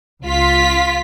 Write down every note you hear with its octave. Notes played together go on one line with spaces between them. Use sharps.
C#2 F4 B6